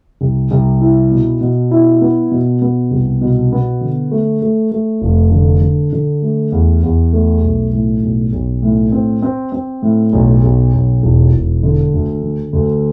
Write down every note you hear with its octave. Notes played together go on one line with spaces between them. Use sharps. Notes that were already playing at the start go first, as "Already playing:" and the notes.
C2
C2
E4
B2
B2
E4
B3
B2
B3
C2
B2
B3
D3
A3
A3
A3
F1
D3
D3
D3
A3
E2
E2
A3
B1
A2
B1
B1
A2
C4
C4
C4
A2
B1
B1
B1
E1
E1
D3
D2
D3
D2